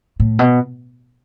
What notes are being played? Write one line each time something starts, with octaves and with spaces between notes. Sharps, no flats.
A2
B2